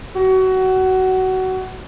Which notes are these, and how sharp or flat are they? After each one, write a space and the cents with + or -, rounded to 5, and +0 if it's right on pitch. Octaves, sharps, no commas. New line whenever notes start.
F#4 +20